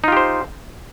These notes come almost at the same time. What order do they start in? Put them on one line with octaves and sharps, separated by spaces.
D#4 F4 G4 C5